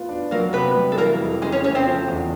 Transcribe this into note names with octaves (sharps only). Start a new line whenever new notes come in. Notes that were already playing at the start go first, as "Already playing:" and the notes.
Already playing: B3 F4
D4
F#3 A#3 A#4
C3 B3 B4
G3
A4
E3 A#3 A#4
F2
C#3 G#3 G#4
C#4 C#5
A3 C#4 C#5
C4 C5
F3
E2